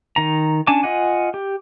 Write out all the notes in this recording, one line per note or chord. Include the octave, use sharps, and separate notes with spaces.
D#3 A#5
C#4 D4 G#5 A5 D6
F4 D#5 F#5 G#5
G4